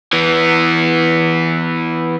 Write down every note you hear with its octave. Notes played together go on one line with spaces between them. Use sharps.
E3 B3